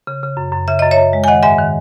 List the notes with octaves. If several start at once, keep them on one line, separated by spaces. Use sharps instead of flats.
C#3
C#3
F#2
F#2
C#3 E5
F#2 D#5
C#5 E5
F#2
G#3
G#5
D#3 D#5 F#5
G#2 E5 G#5
D#3